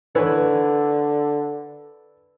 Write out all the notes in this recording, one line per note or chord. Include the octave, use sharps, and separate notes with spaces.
D3 E3 B4 C#5